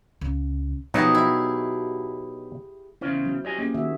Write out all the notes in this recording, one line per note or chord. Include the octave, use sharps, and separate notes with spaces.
C#2
B2 F3 F#3 D#4 G4 G#4
E4
E2 C#3 C#4 E4 C5
F#3
G4 C#5 D#5 G#5
A#3 C#4 G#4
D#3 F#4 E5